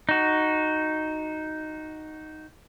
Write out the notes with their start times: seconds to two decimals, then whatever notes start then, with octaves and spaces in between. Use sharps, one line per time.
0.09 D#4 F#4